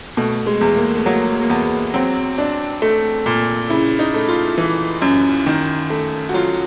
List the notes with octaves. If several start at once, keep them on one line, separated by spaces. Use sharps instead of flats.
B2 A3
G#3
E2
A#3
A3
F#3 A#3
A#3
E2 B3
F#3 C4
D4
A3
A#2
C#3 E4
D#4
A3
F4
E3
F#2
D#3
A3
F#4
F#3 F4